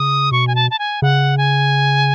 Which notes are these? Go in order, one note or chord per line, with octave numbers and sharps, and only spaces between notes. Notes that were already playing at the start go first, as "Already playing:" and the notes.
Already playing: C#3 D#6
B2 C#6
G#5
A5
A5
G#5
C#3 F#5
G#5